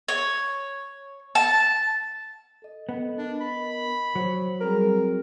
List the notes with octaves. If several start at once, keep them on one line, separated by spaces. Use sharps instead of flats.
C#5
A5
A4 D#5
B3
D4 A#4 D#5
B5
F#3 C5
G3 C4 G#4 A#4